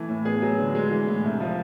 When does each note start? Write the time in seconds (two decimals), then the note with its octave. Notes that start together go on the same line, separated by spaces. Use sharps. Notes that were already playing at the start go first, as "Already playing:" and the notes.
Already playing: E3 A3
0.09 A2
0.25 B3 G#4
0.42 F#3
0.59 D3
0.75 G#3
0.91 E3
1.08 A2
1.24 C2
1.40 F3